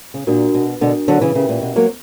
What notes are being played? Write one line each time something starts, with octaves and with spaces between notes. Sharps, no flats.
C#3
A#2 D4 F#4 A#4
B2
B2 D3 D4 F#4 A#4
D3 F#3
C#3 E3
C#3 C#4 G4 A#4 E5 G5
A#2
B2
F#3 A#3